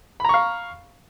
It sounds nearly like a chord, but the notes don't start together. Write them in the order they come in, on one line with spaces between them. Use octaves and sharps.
B5 A#5 C#6 F5